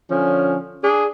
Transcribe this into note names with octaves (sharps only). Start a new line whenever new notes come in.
D3 F3 C#4
D4 G#4